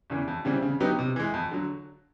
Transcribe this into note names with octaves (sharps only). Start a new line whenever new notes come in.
E2 C#3 E3
F2
C#3 E3 G3 C4
C#3
F#3 B3 D#4 G4
C3
E3 G#3
F2
D3 F#3